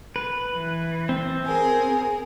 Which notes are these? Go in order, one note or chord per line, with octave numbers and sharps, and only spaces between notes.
B4
E3
C4
G#4 A#4